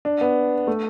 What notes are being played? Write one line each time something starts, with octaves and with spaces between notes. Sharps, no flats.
D4
B3
A3